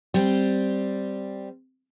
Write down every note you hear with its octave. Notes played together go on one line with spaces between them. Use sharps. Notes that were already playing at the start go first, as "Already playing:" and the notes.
G3 C4